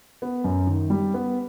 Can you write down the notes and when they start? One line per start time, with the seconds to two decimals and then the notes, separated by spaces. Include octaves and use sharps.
0.22 B3
0.44 F#2
0.67 D#3
0.90 G3
1.14 B3